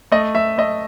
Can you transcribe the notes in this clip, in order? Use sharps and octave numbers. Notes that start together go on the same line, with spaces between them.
A3 D#5
A3 E5
A3 D#5